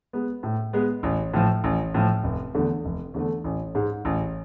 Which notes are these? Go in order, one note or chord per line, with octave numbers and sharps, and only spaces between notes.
G#3 B3
A2
G#3 B3
A1
A2 F3
A1
A2 F3
F1
E2 D3 A3
F1
E2 D3 A3
A1
G#2 G#3
A1